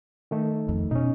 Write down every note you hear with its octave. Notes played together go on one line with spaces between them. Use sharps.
D#3 A3 D#4
F2
B2 C#4 D#4